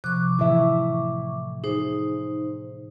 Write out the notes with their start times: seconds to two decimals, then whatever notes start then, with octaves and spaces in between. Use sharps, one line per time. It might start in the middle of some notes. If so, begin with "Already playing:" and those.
0.04 C3 F3 C#6 D6 F#6
0.39 A2 E3 E4 E5
1.64 D#4 G#4 C5